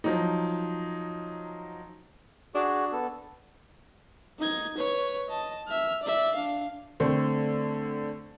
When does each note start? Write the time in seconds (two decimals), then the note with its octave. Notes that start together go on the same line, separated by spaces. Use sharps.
0.04 F3 F#3 D#4
2.55 D4 F#4 G#4
2.92 B3 A4
4.39 D#4 G#6
4.77 B4 C#5
5.29 D#5 A5
5.67 E5 F6
6.03 D5 E5
6.35 D4 F5
7.00 D3 A3 C4